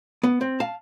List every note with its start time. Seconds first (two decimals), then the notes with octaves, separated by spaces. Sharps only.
0.23 B3
0.41 C4
0.60 F5 A5